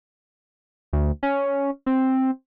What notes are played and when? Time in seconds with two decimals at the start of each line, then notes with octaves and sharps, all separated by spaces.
0.93 D2
1.23 C#4
1.86 C4